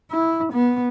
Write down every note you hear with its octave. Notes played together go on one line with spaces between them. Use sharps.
E4
B3